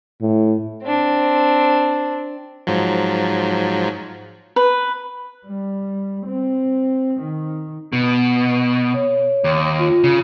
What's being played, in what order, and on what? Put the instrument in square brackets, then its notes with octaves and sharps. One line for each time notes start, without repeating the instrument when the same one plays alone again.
[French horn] A2
[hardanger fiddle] C4 D4
[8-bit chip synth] G#2 F3 F#3
[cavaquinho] B4
[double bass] G3
C4
D#3
[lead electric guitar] B2
[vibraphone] C#5
[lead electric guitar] D#2
[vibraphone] F4
[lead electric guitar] C#3